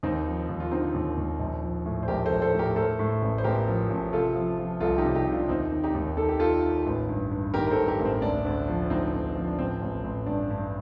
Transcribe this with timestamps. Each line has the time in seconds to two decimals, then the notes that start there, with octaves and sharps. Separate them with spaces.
0.03 D#2 C4 D#4
0.27 F3
0.49 D#2
0.60 F4
0.71 D3 C4 D#4
0.94 D#2
1.17 D#2
1.39 A#1
1.63 F3
1.86 A2
2.03 C5
2.08 A#1 G4 A#4
2.25 A4 C5
2.30 A#1
2.42 A4 C5
2.54 A2
2.59 G4 A#4
2.76 A2 A4 C5
2.99 A2
3.22 A1
3.38 C5
3.44 A1 G4 A#4
3.67 F3
3.89 A1
4.13 C3 F4 A4
4.35 F3
4.58 F3
4.80 C2 F4 A4
4.98 D#4 G4
5.04 C3
5.15 D#4 G4
5.27 C3
5.32 D4 F4
5.49 D#2 C4 D#4
5.72 D#3
5.84 D#4 G4
5.94 D#2
6.17 D#3 A4
6.29 G4
6.40 D#3 F4 A4
6.63 D#3
6.86 A1
7.09 G2
7.31 G2
7.54 D#3 G4 A#4
7.67 A#4
7.71 A4 C5
7.77 G2
7.88 G4 A#4
7.99 A1
8.05 C4
8.22 D2 D4
8.45 D2
8.68 F3
8.90 D2 C4 D#4
9.13 D2
9.36 F3
9.47 D4
9.59 A1 C4
9.82 A1
10.04 A1
10.26 G2 D4
10.50 G2